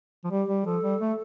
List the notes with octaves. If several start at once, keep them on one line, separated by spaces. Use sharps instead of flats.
F3
G3 G4
G3
F3 A4
G3
A3